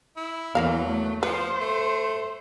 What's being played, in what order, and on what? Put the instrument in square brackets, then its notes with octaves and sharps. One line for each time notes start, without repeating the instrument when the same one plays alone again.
[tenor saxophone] E4
[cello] E2 E3 [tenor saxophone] F#3 [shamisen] A#3 A#4 F5
[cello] A3
[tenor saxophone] F3 [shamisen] B4 [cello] C5
[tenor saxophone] A3